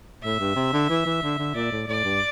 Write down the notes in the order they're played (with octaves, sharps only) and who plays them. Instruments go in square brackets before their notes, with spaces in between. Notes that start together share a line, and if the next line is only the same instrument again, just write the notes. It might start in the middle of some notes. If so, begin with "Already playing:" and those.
[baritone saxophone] A2 [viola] E5
[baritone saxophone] G2
C3
D3
E3
E3
D3
D3
[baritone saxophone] A#2 [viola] D5
[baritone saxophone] A2
[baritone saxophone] A2 [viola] D5
[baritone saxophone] G2